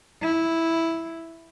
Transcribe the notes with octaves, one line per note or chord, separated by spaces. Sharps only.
E4